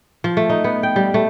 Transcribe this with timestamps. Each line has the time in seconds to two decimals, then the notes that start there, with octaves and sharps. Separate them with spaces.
0.24 F3
0.37 A3
0.49 D#4
0.64 B3
0.83 G5
0.96 G3
1.14 A3